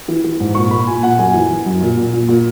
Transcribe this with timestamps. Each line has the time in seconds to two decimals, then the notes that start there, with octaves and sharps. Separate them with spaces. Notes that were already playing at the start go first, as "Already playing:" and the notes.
0.08 E3
0.24 E3
0.40 G#2
0.55 A#2 C#6
0.71 A#2 B5
0.87 A#2 G#5
1.03 A#2 F#5
1.19 F#2 G#5
1.34 E3
1.49 E3
1.66 F#2
1.81 A#2
1.97 A#2
2.13 A#2
2.29 A#2